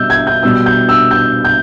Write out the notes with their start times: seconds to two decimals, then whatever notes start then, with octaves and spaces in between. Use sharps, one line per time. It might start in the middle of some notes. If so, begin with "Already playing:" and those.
Already playing: B2 G3 E6 G6
0.10 G#6
0.27 G6
0.43 B2 G3 B3 E6
0.66 G6
0.89 E6
1.11 G6
1.45 G6